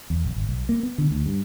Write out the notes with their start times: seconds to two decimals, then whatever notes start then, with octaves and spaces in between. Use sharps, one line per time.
0.10 E2
0.24 A#1
0.36 G#1
0.49 B1
0.69 A#3
0.83 B3
0.98 D3
1.11 D2
1.26 G2